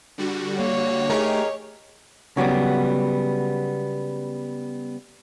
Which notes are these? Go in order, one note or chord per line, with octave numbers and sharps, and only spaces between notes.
D3 G3 F#4
A#3 C#5
A3 D#4 G4 G#4 A#4
C#3 F#3 G3 B3